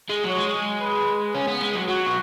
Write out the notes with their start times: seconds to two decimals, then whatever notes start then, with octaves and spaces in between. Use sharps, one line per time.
0.10 G#3
0.24 F#3 C#5
0.37 G#3
0.81 B4
1.35 C#4
1.48 B3
1.61 G#3
1.76 F#3
1.88 F#3 F#4
2.07 B3